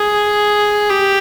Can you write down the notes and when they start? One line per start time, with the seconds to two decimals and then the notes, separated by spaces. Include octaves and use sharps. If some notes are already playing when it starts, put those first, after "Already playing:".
Already playing: G#4
0.89 G4